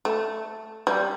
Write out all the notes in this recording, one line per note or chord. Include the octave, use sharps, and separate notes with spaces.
A3
G3